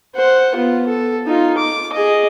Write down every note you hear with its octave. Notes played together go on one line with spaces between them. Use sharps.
C5 F#5
B3 F4
A4
D#4 F4
D6
G#4 D#5